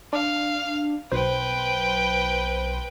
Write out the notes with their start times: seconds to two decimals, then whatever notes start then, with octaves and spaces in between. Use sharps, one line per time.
0.13 D4 F5
1.12 B1 B4 C5 G5